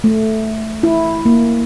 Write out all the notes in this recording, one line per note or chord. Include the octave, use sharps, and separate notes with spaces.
A3
E4
A#3